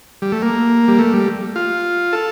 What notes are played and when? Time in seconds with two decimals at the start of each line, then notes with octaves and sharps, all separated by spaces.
0.22 G3
0.32 A3
0.42 A#3
0.88 G3
0.99 A3
1.14 G3
1.56 F4
2.13 A4